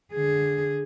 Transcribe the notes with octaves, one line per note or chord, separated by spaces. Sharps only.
D3 G#4